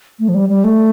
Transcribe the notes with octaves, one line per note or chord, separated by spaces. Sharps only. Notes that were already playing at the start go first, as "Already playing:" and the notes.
A3
F3
G3
G3
A3